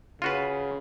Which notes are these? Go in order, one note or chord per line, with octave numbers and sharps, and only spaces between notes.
C#3 F4 F#4 B4